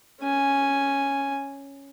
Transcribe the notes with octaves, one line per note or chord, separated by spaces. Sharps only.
C#4 G#5